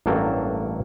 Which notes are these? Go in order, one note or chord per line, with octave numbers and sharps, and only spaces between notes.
A1 G2 F#3 A#3 A4 G5